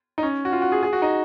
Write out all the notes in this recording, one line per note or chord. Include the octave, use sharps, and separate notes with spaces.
D#4
C#4
F#4
F4
F#4
G#4
G#4
F#4
D#4